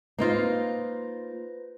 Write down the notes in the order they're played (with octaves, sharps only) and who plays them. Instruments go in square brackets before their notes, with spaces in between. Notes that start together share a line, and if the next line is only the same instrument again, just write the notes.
[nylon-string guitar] A#3 D#4 F4 [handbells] B4 C5 A#6